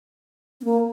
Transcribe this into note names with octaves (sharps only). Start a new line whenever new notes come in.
C4
A#3